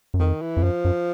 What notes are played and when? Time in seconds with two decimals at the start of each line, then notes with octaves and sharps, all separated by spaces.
0.14 F#2
0.19 F2 D#3
0.41 E3
0.57 F2
0.63 F#2 F3
0.85 F#2